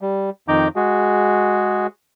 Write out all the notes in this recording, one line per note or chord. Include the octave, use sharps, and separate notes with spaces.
G3
F2 D#3 D#4 A#5 D6 G6
G#3 F#4 G#4